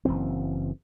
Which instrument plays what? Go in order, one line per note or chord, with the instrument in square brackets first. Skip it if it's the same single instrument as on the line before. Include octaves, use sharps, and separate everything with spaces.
[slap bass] F#1 F#2 E3 C4